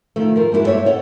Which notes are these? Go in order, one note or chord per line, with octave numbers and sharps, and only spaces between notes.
D#3 F3 A3
F3 A#4
G#3 A#3 D4 E4 F#4
G2 A4 C5 C#5 E5
A4 C#5 D#5 F#5